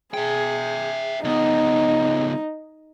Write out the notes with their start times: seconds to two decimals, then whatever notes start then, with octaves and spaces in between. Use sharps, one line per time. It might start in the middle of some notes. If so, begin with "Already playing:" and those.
0.14 G#4 E5 G5
1.24 C#2 B3 D#4